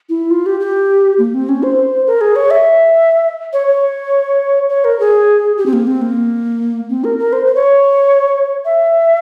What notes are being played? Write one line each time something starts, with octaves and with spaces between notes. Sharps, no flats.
E4
F4
G4
G4
A#3
C4
C#4
C5
A#4
G#4
C#5
E5
C#5
C#5
C#5
A#4
G#4
G4
C4
A#3
C4
A#3
C4
A#4
A#4
C5
C5
C#5
E5